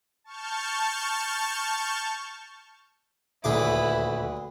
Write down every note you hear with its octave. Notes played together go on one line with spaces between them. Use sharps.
A5 C#6 F6 G6
D#1 D2 E4 G#4 B4 E5 D6